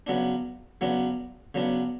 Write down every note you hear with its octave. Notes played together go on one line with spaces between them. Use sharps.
C#3 F#3 B3 D4
C#3 F#3 B3 D4
C#3 F#3 B3 D4